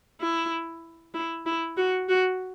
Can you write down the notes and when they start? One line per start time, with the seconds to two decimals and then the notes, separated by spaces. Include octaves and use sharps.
0.21 E4
1.14 E4
1.46 E4
1.77 F#4
2.09 F#4